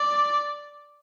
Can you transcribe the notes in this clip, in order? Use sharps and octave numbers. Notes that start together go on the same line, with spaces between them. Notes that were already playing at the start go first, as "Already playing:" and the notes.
Already playing: D5